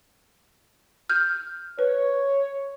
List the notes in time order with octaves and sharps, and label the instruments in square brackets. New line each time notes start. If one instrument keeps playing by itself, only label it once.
[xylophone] F6 G6
[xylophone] B4 [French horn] C#5